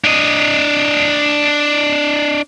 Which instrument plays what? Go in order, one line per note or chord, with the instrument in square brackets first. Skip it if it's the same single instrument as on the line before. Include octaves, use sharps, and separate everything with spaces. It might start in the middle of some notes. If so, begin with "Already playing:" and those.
[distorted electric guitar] D4 D#5